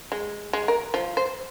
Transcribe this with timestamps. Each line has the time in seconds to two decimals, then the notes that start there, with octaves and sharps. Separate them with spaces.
0.12 G#3
0.53 G#3
0.68 A#4
0.94 F3
1.17 C5